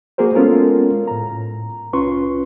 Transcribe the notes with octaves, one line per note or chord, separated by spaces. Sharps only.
A3 A#3 F#4 G#4 A#4 C5
G#3 B3 C#4 F4 A4 A#4
A2 A#5
C2 C#4 F4 B4 C6 C#6